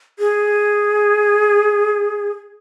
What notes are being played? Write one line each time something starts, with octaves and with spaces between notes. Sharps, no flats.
G#4